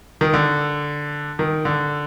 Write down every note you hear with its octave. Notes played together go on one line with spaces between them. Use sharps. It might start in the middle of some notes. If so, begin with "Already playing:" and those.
D#3
D3
D#3
D3